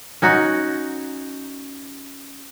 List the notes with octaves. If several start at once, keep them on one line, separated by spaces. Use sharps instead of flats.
C#4 D#4 F#4